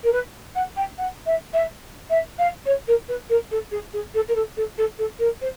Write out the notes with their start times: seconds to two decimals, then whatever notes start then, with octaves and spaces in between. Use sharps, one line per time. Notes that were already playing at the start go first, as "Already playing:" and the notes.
0.04 A#4
0.12 B4
0.55 F#5
0.76 G5
0.98 F#5
1.26 E5
1.53 E5
2.10 E5
2.38 F5
2.66 C#5
2.88 A#4
3.09 B4
3.29 A#4
3.51 A4
3.71 G#4
3.93 G#4
4.14 A4
4.28 A#4
4.35 A4
4.57 A4
4.78 A4
4.98 A4
5.19 A#4
5.41 C5